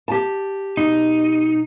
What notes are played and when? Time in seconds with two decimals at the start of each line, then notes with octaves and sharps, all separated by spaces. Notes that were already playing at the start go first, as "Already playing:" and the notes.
0.08 G4 A5
0.77 B2 D#4